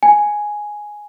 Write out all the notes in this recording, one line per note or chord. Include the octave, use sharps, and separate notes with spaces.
G#5